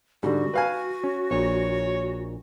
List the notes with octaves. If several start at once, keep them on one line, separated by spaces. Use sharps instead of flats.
G#2 D3 G3 F#4
B4 F5 G5 G#5
C#4
A#1 A#2 C#5